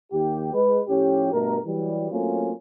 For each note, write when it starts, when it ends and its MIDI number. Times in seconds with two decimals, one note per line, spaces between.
0.12 0.51 39
0.12 0.51 67
0.54 0.80 56
0.54 0.80 71
0.89 1.30 45
0.89 1.30 53
0.89 1.30 61
0.89 1.30 67
1.33 1.58 43
1.33 1.58 47
1.33 1.58 57
1.33 1.58 70
1.65 2.06 52
1.65 2.06 54
1.65 2.06 55
2.10 2.52 54
2.10 2.52 57
2.10 2.52 58
2.10 2.52 60
2.10 2.52 61
2.10 2.52 65